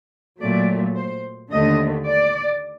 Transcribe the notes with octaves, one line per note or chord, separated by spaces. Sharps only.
A#2 F#3 A3 D5
C5
D#2 D3 A3 D#5
D5